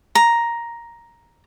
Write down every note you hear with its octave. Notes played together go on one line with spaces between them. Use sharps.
A#5